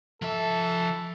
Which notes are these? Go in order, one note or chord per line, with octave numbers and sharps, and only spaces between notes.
F3 A4 E5